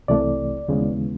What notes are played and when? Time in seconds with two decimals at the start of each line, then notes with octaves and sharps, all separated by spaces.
0.08 C2 C3 E3 A3 D5
0.68 D#2 C#3 E3 G#3 B3